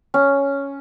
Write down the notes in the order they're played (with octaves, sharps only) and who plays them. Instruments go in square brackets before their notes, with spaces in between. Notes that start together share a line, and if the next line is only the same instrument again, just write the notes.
[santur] C#4